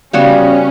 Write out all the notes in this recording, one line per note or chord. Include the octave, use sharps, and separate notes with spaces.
C#3 G3 B3 C#4 F#4